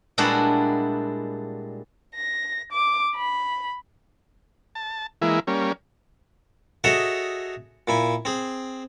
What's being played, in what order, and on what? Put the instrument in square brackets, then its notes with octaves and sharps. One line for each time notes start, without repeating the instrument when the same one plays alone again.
[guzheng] A#2 G3 G#3 D4 E4 F#4
[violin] A#6
D6
B5
[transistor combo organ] A5
E3 G#3 A#3 E4
G3 A#3 C#4
[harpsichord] F#4 G#4 A4 C#5 D#5 E5
A#2 E4 G#5
C4 G#4